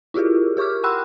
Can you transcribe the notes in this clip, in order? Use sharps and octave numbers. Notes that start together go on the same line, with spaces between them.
E4 F4 G4 G#4 A#4
G4 A#4 C#6 D6 F6
F#5 G5 B5 C6 E6 F#6